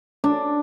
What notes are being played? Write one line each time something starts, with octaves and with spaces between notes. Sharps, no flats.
D4